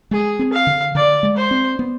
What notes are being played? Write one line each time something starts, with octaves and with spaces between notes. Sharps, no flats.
G#3 G#4
C4
F5
D3
D3 D5
G#3
C5
C4
B3